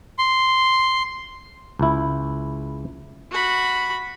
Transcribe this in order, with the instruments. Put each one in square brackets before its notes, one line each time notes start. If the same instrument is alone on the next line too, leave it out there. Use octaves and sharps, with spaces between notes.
[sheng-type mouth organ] C6
[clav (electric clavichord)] C#2 E4
[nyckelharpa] F#4 B5